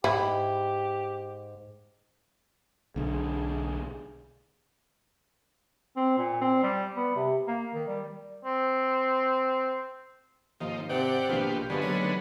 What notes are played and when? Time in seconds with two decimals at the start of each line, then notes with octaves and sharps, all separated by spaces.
0.04 G#2 E4 G4
2.96 B1 D3 G#4
5.96 C4
6.18 A#2
6.41 C4
6.63 G3
6.97 B3
7.16 C3
7.47 A#3
7.74 D#3
7.88 G3
8.45 C4
10.61 D#2 G#2 D#3 F3 D#4
10.89 C3 C4 G4 D5 F#5
11.29 A#1 B2 F4 G4 G#4 D5 F5
11.70 G2 D3 F3 G#3 B3 F#4 G#4 E5
11.82 D#2 F#3 G3 A3 C#5